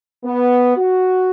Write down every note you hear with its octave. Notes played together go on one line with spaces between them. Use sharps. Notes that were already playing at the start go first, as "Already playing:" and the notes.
B3
F#4